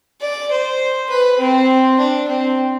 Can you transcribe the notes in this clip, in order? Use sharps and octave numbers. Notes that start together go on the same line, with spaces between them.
D5
C5
B4
C4
D4
C4